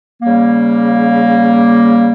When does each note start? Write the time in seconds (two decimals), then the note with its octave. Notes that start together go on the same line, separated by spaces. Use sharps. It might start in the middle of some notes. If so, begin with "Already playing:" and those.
0.22 C#3 G3 A#3